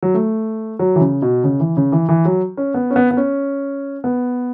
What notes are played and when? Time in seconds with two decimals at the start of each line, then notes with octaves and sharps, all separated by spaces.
0.03 F#3
0.14 A3
0.79 F#3
0.96 E3
1.00 C#3
1.22 B2
1.44 C#3
1.60 E3
1.77 C#3
1.92 E3
2.09 E3
2.25 F#3
2.57 C#4
2.74 B3
2.90 C#4
2.96 B3
3.11 B3
3.17 C#4
4.04 B3